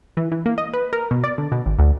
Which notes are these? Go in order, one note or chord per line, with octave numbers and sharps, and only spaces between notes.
E3
E3
A#3
D#5
B4
A#4
B2
D5
D3
B2
G#1
D2